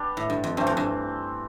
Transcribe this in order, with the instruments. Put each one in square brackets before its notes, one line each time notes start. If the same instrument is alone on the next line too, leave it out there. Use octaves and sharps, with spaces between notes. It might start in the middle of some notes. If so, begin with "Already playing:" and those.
Already playing: [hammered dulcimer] G3 B3 D4 G4
[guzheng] A2
G2
F2
[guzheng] G2 [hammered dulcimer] E3 A3 C4
[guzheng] F2
G2